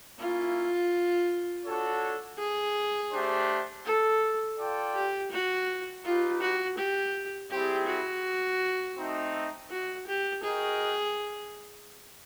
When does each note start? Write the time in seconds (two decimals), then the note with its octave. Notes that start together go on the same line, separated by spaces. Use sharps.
0.18 A#3 C#4 E4 F4
1.65 D4 F#4 A4 C#5
2.38 G#4
3.11 A3 D4 G4 C5
3.85 A4
4.58 F4 A4 D5 G5
4.95 G4
5.32 F#4
6.04 D#4 F4 G4 B4
6.41 F#4
6.78 G4
7.50 G3 C4 E4 G4 G#4
7.87 F#4
8.97 A3 C4 D#4
9.70 F#4
10.07 G4
10.43 F#4 G#4 A#4 D#5 G5